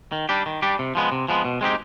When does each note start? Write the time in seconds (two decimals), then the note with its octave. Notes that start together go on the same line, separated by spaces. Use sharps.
0.12 D#3
0.29 G3 D4 G4
0.46 D#3
0.62 G3 D4 G4
0.79 C3
0.95 F3 G#3 B3
1.12 C3
1.28 F3 G#3 B3
1.45 B2
1.61 G#3 C4 D#4 G4